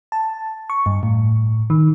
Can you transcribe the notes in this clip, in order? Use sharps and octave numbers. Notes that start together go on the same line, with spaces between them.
A5
C#6
G2
A2
D#3